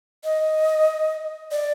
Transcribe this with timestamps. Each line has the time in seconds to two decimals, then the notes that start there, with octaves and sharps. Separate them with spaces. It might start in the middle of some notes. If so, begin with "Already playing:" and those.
0.24 D#5
1.51 D5